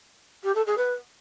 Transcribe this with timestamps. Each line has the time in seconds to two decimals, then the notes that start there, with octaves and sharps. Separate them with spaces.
0.43 G4
0.55 A4
0.66 G#4
0.77 B4